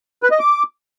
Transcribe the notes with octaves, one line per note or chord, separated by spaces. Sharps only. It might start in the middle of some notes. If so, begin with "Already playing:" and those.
B4
D#5
D6